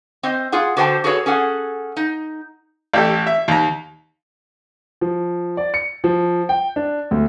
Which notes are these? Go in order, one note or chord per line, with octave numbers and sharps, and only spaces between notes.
C4 C5 D#5
F4 G#4 F#5
D3 F#4 C5 F#5 G5 A5
F#4 G#4 A4 B4 C#5
C#4 G#4 A4 F#5
D#4
A1 G4 A4
E5
D#2 A#5
F3
D5
C#7
F3
G5
D4
D2